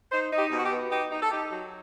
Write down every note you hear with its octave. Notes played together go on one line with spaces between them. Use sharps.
D#4 C5
D#4
G4
B2
F#4
G4
B3
D#4 G4
D#4
A4
D#4 G4
F#3